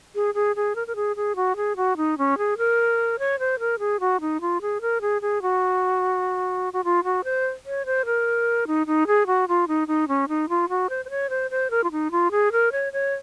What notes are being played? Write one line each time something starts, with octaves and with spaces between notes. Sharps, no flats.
G#4
G#4
G#4
A#4
A#4
G#4
G#4
F#4
G#4
F#4
D#4
C#4
G#4
A#4
C#5
C5
A#4
G#4
F#4
D#4
F4
G#4
A#4
G#4
G#4
F#4
F#4
F4
F#4
C5
C#5
C5
A#4
D#4
D#4
G#4
F#4
F4
D#4
D#4
C#4
D#4
F4
F#4
C5
C5
C#5
C5
C5
A#4
F4
D#4
F4
G#4
A#4
C#5
C#5